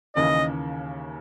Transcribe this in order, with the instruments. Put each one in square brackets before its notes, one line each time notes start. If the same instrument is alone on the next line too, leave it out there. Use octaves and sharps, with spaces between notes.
[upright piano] D#2 C#3 E3 A#3 C#4 [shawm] D#5